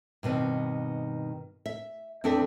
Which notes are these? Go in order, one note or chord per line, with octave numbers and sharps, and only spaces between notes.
G2 B2 D#3 C4
E5
E2 C4 D4 A4 B4 E5